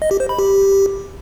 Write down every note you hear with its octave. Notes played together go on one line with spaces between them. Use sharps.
D#5
G4
C5
B5
G4